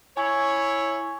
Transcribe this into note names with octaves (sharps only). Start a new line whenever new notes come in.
E4 C#5 G#5 C#6 G#6